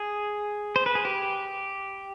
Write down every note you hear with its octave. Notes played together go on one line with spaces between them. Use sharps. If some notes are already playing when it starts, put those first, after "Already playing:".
Already playing: G#4
C5
B4
G#4
G4